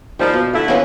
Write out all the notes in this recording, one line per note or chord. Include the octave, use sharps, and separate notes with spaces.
F3 G3 D#4 A#4
B2
D3 A3 E4 F5 A5
C#3 E3 F3 B3 C#4 C#5